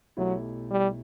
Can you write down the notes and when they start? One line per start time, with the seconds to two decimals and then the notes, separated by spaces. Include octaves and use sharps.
0.17 B1 B2 F#3 A3 E4 G4
0.71 G3